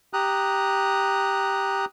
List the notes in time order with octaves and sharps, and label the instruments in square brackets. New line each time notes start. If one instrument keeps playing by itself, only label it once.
[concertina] G4 A#5 D#6 F#6